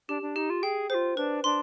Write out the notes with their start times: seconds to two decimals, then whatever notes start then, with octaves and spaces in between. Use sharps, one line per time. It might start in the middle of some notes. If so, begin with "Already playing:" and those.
0.09 D4 G4
0.22 D4
0.36 D#4 G4
0.50 F4
0.63 G#4 G5
0.90 F4 G#4 C5
1.17 D4 B4
1.44 D4 C6